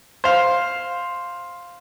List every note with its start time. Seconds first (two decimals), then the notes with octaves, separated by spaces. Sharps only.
0.24 C5 F5